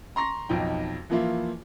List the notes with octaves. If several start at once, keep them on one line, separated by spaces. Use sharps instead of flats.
A#5 C6 C#6 A#6
B1 F2 D#4 G5
E3 F3 A#3 E4 F4